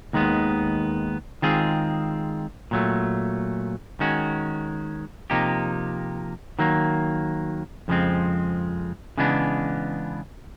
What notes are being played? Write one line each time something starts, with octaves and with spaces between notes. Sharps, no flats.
D#2 D#3 G#3 B3
D#3 G#3 C4 F4 G#4
A#2 F#3 A3
D#3 G#3 C#4 F#4
C3 F3 A#3 D#4 G4
D#3 F#3 A#3
F2 C#3 F3 G#3 C4
C#3 E3 G#3 B3 D4